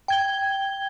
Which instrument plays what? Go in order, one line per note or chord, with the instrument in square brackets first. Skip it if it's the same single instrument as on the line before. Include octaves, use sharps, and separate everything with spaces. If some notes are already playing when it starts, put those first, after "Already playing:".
[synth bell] G5 G#6 G7